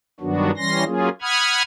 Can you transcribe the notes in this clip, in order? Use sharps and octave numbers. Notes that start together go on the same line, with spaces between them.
G2 D#3 F#3 B3 D4 F#4
E3 G3 C#4 C6 A#6
F#3 A#3 C#4 F4 G#4
F#5 B5 D#6 F6 G#6